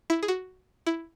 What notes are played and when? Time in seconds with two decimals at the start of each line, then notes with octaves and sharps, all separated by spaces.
0.10 E4
0.23 G#4
0.28 F#4
0.86 E4